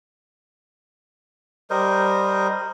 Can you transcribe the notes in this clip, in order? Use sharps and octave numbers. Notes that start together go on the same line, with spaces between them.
G3 A#4 C5 D#5